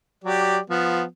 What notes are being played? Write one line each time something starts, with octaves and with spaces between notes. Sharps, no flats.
F#3 G4 D5
F3 B3